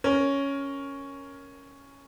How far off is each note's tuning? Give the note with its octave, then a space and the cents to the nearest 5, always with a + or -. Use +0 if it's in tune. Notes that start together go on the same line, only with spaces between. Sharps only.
C#4 +0 A#4 +0